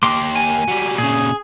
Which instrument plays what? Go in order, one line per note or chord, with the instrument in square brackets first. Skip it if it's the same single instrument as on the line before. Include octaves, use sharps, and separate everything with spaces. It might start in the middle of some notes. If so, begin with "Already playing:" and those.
[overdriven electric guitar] A#3 G4 [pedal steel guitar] C6 D6
[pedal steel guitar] G#5
[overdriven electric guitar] F#3 G3
[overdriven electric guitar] A#2 C#3 [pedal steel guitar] G#4